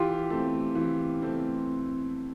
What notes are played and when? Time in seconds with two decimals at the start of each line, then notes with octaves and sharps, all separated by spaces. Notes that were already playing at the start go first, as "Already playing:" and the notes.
Already playing: E3 F4 G4
0.30 A3 C4
0.75 E3
1.22 A3 C4